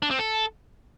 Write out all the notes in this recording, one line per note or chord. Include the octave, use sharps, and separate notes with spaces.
D4
C4
A4